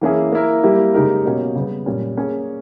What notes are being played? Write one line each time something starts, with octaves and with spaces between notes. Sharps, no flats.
E3 A#3 C#4 E4 G#4
A#3 E4 A#4
G3 A#3 E4 G4
C#3 G#3 D#4 G4 A#4
B2 A#3 C#4
C#3 G3 B3
A#2 G3 C#4
A#3 C#4 G#4